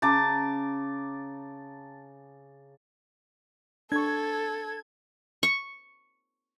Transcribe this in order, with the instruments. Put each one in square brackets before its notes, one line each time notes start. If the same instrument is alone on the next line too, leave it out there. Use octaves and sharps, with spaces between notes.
[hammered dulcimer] C#3 A5 A#5 D6
[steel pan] D4 C#6 [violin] A4 [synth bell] G#6
[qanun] C#6